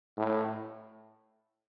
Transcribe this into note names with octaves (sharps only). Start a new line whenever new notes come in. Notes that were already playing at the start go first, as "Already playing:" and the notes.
A2